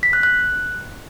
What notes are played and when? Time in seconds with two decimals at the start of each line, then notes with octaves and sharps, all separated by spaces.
0.03 B6
0.13 F#6
0.23 F#6